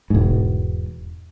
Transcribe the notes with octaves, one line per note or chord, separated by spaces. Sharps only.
E1 G#2